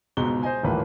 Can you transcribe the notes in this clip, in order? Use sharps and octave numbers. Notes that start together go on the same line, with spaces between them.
C#2 G#2 B2 G7
C5 D#5 G#5
D#1 A1 D#2 A#3 B4